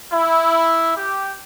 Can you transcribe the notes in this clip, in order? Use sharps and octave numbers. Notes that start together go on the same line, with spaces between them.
E4
G4